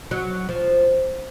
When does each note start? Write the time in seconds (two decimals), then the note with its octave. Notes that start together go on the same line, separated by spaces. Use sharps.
0.11 F#3
0.49 F3